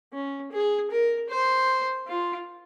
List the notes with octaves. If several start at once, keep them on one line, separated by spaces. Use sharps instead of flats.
C#4
G#4
A#4
C5
F4